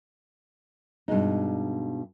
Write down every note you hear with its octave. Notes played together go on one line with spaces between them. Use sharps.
G2 B2 G#3 D#4